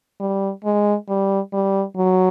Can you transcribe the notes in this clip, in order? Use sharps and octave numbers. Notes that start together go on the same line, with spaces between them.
G3
G#3
G3
G3
F#3